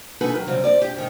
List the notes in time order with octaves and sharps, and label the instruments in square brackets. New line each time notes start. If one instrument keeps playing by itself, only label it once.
[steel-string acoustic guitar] B3 D#4 F#4 A4 B4 G#5
D#3 F#3
C#3 F#3 G3 C4
C4 D5
G4
G#2 D#3